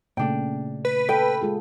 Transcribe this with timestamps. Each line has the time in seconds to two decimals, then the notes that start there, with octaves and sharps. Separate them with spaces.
0.17 A#2 C#3 A3 D4 G5
0.85 B4
1.09 A4 G5
1.42 G#3 F4 G#4